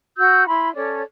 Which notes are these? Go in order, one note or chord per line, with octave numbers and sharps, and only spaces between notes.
F#4 E6 G6
E4 B5 C6
C#4 A4 C#5 D5